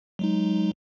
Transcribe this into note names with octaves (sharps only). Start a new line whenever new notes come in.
F#3 G#3 D#4